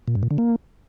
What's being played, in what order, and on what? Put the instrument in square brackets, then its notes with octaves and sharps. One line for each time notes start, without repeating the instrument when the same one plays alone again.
[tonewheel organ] A#2
G2
A#2
D3
A#3